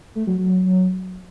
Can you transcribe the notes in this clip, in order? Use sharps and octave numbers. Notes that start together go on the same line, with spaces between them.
A3
F#3
F#3